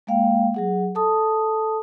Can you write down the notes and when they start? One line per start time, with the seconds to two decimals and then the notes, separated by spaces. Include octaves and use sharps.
0.07 G#3 A#3 F5 G5
0.54 F#3 G#4 F#5
0.95 A4 A5 D#6